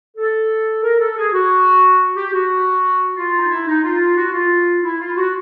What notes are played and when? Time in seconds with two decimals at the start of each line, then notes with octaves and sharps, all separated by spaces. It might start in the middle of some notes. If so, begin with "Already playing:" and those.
0.17 A4
0.83 A#4
1.00 A4
1.17 G#4
1.33 F#4
2.16 G4
2.34 F#4
3.16 F4
3.38 D#4
3.50 E4
3.67 D#4
3.84 F4
4.16 F#4
4.33 F4
4.83 E4
5.00 F4
5.17 F#4